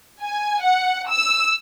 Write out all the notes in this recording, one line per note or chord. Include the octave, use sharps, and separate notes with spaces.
G#5
F#5
E6